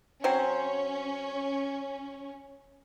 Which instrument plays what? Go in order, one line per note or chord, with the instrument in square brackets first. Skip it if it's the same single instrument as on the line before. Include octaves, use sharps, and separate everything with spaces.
[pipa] F#3 C4 C5 [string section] C#4